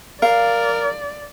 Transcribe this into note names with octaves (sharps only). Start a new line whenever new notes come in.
A#4 D5 F5